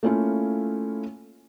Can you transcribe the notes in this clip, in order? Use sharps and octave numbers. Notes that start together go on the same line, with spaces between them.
A3 A#3 C#4 E4 F4